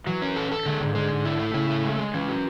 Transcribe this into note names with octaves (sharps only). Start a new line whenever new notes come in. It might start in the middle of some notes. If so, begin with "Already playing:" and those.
E3 F#3
C#4
A4
A4
D3 G#3
G#2 D3
D3 G#3
G#2
E4
A3
C#3 E4
A3
G#3
G#3
E3 C#4
F#4